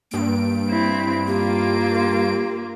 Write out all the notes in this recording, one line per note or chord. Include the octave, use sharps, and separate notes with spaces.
G2 A#3 D7
C4 E4
A#3 F4 G4